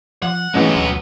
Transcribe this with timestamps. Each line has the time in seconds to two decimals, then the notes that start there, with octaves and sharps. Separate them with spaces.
0.23 F3 F#5
0.54 G#1 C#3 E3 F#3 A3 B3
0.76 D2